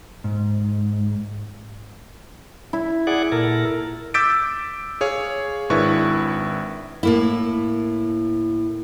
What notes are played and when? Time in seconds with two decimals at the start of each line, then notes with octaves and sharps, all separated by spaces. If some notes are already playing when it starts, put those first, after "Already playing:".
0.24 G#2
2.73 E4
3.07 G#4 D5 F#5
3.32 A#2 A4 A#4
4.14 D6 E6 G6 A6 B6 D7
5.01 G#4 C#5 F5
5.70 G#1 D4 E4 A#4 B4 C#6
7.03 A2 A#3 E4